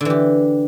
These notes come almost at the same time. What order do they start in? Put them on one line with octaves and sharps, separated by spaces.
D3 E3 G4